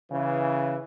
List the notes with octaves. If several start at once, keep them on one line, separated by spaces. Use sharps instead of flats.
C#3 E3